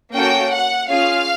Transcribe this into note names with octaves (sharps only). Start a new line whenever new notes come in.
A#3 C#4 F#4 A4 G5
F#5
C#4 F4 G#4 F5